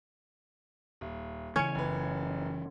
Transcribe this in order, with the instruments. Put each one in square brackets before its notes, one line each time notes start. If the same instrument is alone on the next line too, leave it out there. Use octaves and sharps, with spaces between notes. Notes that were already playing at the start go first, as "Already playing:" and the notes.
[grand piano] D#1
[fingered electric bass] C#3 E3 [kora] C#4 [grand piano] G#6 C#7
[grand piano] F#1 B4